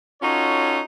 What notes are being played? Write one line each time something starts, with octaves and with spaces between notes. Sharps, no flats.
C#4 D#4 F4 F#4 A4 C#5